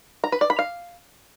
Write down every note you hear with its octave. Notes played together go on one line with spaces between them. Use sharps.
A#5
B4
D5
B5
F5